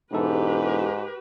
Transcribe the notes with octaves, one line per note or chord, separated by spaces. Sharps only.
E1 G#2 D#4 E4 G4 A4 B4